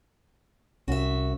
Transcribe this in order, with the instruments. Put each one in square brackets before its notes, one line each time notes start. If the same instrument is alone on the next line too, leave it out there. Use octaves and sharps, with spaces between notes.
[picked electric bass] C2 [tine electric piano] C#4 [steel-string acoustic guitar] F#4 E5